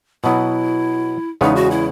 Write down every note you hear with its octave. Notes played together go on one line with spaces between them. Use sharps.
B2 F#3 B3 E4
E2 C#3 G#3 B3 D#4
F#4
E4